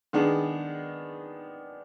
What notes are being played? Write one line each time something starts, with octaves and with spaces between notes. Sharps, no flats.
D#3 G#3 B3 D4 G#4